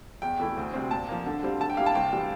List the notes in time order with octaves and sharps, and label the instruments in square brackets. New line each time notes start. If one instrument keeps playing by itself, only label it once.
[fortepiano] E2 [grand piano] G5
[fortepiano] E3 A3 E4
D2
C3 G3 C4
[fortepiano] A#2 [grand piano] A5
[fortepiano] F3 A#3
D3
G3 C4 F4
[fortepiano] D3 [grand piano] A5
[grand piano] G5
[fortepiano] G3 A#3 E4 G4 [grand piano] F5
[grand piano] A5
[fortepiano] C2 [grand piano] G5
[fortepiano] C3 E3 G3 D4